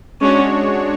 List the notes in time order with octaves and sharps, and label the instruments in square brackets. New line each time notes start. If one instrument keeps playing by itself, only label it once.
[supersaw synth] G#3 D4 F#4 C#5 [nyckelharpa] C#4